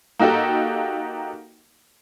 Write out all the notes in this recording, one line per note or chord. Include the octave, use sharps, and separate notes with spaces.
A#3 D#4 F#4 G4 A4